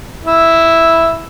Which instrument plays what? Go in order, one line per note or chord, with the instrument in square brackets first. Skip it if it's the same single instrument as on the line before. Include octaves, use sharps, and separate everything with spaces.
[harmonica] E4